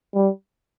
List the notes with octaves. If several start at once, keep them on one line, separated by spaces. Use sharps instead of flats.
G3